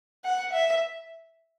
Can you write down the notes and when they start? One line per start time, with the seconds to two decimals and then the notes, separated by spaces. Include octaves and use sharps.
0.24 F#5
0.53 E5